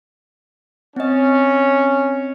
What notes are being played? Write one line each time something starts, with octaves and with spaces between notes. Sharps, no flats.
C4 C#4 D#5